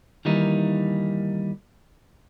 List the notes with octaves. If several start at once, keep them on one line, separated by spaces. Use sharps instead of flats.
D#3 E3 G3 A#3 D#4